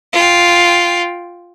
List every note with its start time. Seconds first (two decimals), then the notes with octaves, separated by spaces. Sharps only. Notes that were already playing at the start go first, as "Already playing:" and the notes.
0.13 F4 G5